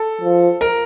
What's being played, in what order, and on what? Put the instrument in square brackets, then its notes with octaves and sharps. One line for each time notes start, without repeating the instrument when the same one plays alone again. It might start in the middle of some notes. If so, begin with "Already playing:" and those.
Already playing: [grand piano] A4
[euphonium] F3
[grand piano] A#4